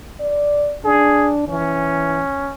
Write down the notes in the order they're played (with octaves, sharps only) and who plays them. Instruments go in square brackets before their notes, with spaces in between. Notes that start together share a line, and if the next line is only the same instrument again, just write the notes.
[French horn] D5
[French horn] D4 [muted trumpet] G#4
[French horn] E3 [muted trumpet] C#4